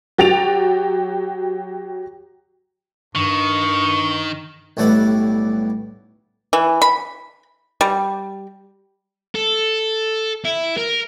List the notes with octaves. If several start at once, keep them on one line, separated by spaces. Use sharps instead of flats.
F#3 G4 A6 D7 F7
G2 D#3 C#6
B1 A2 G3 A4 F#5
E3
B5
G3
A4
E4
A#4